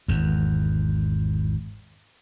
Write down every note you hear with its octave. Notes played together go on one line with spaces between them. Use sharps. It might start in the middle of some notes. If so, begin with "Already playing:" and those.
G#1 E2